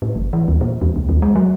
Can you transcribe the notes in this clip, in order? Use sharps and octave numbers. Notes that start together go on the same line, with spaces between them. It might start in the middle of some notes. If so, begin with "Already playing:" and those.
A2
G1
E3
D#2
A#2
E2
C2
D#2
G#3
F#3